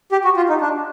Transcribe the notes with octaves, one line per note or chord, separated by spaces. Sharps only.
G4
F#4
F4
D#4
D4